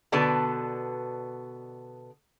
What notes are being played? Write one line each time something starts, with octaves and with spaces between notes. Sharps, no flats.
B2 D3 B3 D5 A5